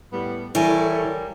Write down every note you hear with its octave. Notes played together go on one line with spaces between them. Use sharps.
A2 G3 B3
E3 G3 E4 A4 A#4 C#5 G#5